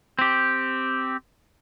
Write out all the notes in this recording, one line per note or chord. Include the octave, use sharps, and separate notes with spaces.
C4 G4